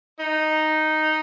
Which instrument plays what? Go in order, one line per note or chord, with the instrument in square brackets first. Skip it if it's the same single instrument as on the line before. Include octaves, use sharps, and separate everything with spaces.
[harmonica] D#4